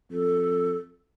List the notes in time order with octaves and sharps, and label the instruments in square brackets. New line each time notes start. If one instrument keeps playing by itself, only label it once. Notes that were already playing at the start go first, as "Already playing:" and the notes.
[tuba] F2 [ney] A4